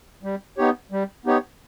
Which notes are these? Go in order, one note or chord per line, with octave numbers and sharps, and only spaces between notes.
G3
B3 D#4 G4 C#5
G3
B3 D#4 G4 C#5